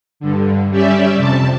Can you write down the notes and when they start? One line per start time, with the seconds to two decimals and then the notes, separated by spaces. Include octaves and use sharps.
0.20 G2 D3
0.71 G3 C#4 G4 D5 E5
1.15 F2 C3 A5